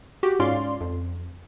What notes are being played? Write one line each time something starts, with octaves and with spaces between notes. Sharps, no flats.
F#4 G4
G#2 C#4 F4 D5 F5 C6
F2